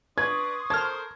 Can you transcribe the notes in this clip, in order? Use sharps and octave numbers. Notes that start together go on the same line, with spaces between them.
D4 B4 D5 C6 C#6 D#6 G#6
A4 A#4 C5 A5 F6 G#6